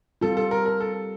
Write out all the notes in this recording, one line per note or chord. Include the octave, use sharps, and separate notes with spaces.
G3 C4 F4 A4
A4
A#4
A#4
A4